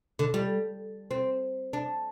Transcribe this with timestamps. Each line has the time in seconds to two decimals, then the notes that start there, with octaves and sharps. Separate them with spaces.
0.19 D3
0.34 G3
1.11 C4
1.73 D4